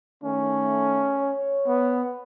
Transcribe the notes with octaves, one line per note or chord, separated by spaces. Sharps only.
D#3 A3 C#4
C#5
B3